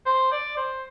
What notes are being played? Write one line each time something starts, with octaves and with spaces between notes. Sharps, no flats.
C5
D5
C5